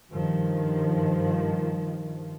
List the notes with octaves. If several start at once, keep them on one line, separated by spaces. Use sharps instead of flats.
G2 D#3 F3